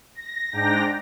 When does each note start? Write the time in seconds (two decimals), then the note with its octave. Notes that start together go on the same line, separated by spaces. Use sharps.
0.15 A#6
0.53 G#2 D4 G5 A#5 A#6